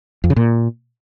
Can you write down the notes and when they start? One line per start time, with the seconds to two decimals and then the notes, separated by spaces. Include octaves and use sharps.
0.24 F2
0.30 C#3
0.36 A#2